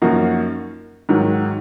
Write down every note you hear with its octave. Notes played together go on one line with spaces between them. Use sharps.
F#2 F3 A#3 D#4 F#4
G#2 D#3 F#3